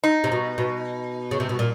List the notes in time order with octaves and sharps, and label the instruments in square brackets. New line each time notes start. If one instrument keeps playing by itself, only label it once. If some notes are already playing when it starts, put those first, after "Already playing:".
[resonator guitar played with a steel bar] D#4
[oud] C3
B2
B2
C#3
C3
B2
A#2